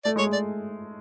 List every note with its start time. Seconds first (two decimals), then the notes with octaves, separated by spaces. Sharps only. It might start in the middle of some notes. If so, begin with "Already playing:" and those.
0.05 A3 D5
0.16 G#3
0.19 C#5
0.26 A3
0.33 D5